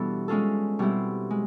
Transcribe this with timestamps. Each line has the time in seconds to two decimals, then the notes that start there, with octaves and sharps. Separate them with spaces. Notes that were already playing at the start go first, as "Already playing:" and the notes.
Already playing: B2 E3 G3 B3 D4 E4 A4
0.28 G#3 C#4 F4 A4
0.79 B2 G3 C4 E4
1.30 G#3